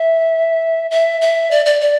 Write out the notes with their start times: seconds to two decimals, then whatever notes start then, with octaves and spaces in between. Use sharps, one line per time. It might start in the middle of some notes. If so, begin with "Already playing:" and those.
Already playing: E5
0.91 E5
1.21 E5
1.51 D5
1.66 D5
1.81 D5